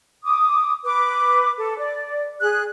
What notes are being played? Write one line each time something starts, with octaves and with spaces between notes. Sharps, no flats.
D6 D#6
B4 D6
A4
D5
G#4 F#6